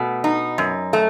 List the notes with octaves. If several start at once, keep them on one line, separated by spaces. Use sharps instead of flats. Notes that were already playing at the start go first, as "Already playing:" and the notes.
Already playing: B2 A3
D#4
F#2
A3